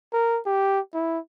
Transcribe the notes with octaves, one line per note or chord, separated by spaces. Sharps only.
A#4
G4
E4